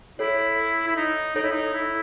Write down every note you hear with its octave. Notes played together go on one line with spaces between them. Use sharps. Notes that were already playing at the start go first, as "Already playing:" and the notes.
E4 A4 C#5
E4
D#4
D#4 A4 C#5
E4
D#4
E4